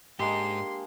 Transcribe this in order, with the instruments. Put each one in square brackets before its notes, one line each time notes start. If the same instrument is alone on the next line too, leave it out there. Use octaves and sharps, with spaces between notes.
[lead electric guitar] G#2 [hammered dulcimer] G#3 A#3 D4 [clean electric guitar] G4 [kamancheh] C6